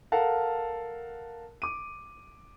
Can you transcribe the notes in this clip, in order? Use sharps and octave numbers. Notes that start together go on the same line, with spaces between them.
A4 A#4 F5 F#5 A5
D6 D#7